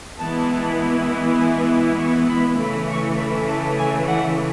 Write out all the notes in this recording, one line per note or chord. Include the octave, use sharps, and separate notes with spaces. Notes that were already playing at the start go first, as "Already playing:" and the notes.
E3 G#3 B3 E4 A5
G#5
C#6
B5
C#3 E3 A3 B5
C#6
B5
A5
G#5
F#5